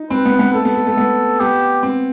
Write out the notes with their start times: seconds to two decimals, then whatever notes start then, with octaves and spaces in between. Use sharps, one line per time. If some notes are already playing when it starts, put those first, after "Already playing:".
Already playing: D#4
0.10 C4 B4
0.26 B3
0.39 B3
0.54 A3 A4
0.65 B3
0.75 A3
0.87 A3
0.97 B3
1.40 B3 G4
1.83 C4